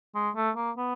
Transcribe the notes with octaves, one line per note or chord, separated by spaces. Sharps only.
G#3
A3
A#3
B3